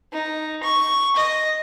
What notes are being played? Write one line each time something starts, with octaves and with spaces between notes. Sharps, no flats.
D#4
C#6
D#5